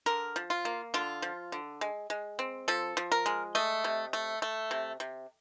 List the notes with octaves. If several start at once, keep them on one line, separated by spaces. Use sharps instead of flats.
D3 A#4
F3
F4
A#3
D3 F4
F3
D3
G#3
G#3
C4
F3 A4
F3
A#4
G#3
A3 D#5
C3
A3
A3
C3
C3